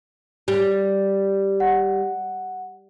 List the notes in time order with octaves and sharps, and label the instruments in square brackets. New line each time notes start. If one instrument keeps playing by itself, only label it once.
[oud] G3
[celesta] F#5